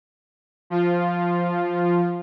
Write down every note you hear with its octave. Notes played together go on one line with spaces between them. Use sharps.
F3 F4